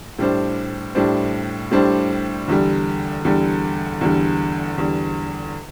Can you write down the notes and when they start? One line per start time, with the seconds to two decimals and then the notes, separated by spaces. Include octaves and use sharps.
0.19 A2 G3 D4 C5
0.95 A2 G3 D4 C5
1.71 A2 G3 D4 C5
2.48 E2 D3 G3
3.25 E2 D3 G3
4.01 E2 D3 G3
4.78 E2 D3 G3